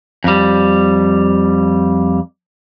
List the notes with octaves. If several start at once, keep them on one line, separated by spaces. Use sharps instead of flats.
F2 G3